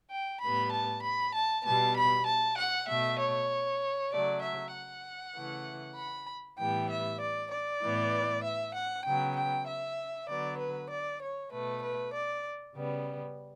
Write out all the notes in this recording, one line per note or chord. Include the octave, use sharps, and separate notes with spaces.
G5
A2 G3 B3 B5
A5
B5
A5
B2 G3 B3 A5
B5
A5
F#5
B2 A3 E5
C#5
C#3 F#3 A3 D5
E5
F#5
C#3 E3 A3
B5
A2 E3 G3 B3 G5
E5
D5
D5
A2 E3 B3
E5
F#5
C#3 F#3 B3 G5
G5
E5
D3 F#3 B3 D5
B4
D5
C#5
B2 A3 B4
B4
D5
C#3 G3 B3